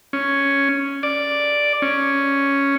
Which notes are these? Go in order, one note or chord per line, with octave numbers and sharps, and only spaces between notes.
C#4
D5
C#4